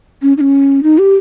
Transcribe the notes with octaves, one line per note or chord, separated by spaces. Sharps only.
C#4
D#4
C#4
D#4
G4